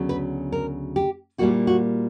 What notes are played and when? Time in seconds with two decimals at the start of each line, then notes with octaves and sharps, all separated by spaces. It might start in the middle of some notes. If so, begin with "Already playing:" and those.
Already playing: D2 C#3 F#3 B3
0.09 B4
0.52 A#4
0.96 G4
1.38 A#2 G3 A#3 E4 F#4
1.67 F#4